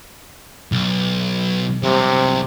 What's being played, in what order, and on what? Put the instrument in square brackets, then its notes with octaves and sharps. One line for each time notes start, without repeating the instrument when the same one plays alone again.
[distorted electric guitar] B1
[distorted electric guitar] C2 F#3 [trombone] C3